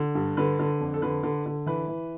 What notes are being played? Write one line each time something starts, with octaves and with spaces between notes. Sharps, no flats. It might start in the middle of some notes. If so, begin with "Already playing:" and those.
Already playing: D3
G2
D3 B4
D3
F2
A4
D3 B4
D3
D3
E3 B4
E3